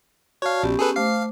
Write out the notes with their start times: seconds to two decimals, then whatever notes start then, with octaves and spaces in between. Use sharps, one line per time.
0.42 F#4 C#5 D5 F5 A5
0.63 A#1 B3 C#4 G4
0.79 G#4 A4 B4
0.96 A3 C5 F5 D6 C7